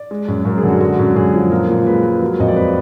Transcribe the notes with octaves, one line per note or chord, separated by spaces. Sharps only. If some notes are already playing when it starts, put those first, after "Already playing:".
Already playing: D5
G#3
F#2
F#2 A#4
G#4
D3
F#4
G#3 F#4
F#2
F#2 G#4
F3
A#2 A#4
A#2
G#3 B4
G#3
F#3 A#4
F2 D#5
D5
B4